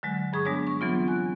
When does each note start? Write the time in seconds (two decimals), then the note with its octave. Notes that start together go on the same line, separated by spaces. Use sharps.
0.03 D3 F#3 G#3
0.33 G2 G#4 C#6 D#6
0.45 G3 G#3 B3 D4 G#4 C#5
0.67 C#6
0.81 E3 F#3 B3 C4 F4
1.08 G#5 F#6